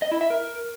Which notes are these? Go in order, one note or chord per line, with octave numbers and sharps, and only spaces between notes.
D#5
E4
E5
A#4